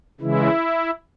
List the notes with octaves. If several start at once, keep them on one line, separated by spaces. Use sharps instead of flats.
C#3 E3 G#3 E4